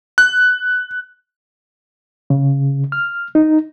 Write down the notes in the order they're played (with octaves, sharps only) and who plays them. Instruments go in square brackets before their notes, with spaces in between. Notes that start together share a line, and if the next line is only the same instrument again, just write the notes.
[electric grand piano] F#6
[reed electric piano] C#3
F6
D#4